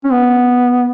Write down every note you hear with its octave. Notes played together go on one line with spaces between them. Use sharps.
C#4
B3